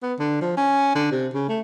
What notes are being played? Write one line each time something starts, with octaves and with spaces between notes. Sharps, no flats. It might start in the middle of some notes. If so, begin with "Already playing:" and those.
B3
D3
F3
C#4
D3
C3
C#3
A3